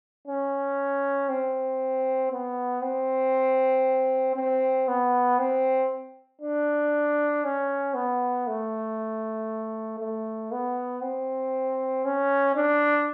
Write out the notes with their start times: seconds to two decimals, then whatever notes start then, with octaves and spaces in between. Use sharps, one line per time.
0.28 C#4
1.29 C4
2.32 B3
2.83 C4
4.36 C4
4.88 B3
5.39 C4
6.41 D4
7.44 C#4
7.94 B3
8.47 A3
9.99 A3
10.52 B3
11.02 C4
12.05 C#4
12.55 D4